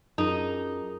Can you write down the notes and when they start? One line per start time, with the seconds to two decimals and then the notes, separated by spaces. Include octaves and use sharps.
0.18 F#2 D#4 F4 G#4 A#4